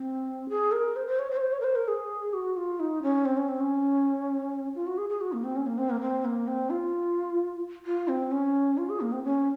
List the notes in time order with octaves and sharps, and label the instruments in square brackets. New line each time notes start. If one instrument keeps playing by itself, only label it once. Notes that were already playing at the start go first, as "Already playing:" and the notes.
Already playing: [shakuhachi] C4
G#4
A#4
C5
C5
C#5
C5
C#5
C5
C#5
A#4
C5
A#4
G#4
F#4
F4
D#4
C#4
C4
C#4
C4
C#4
F4
F#4
G#4
G#4
F#4
A#3
C4
C#4
A#3
C4
A#3
C4
A#3
C4
F4
F4
C4
C#4
F4
G#4
A#3
C4
C#4